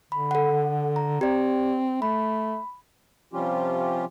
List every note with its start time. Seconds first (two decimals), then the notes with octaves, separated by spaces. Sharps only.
0.12 D3 B5
0.31 A4 F#5
0.96 A#5
1.21 C4 G4 D5
2.02 A3 B5
3.33 C3 F3 G3 C#4 F4 G4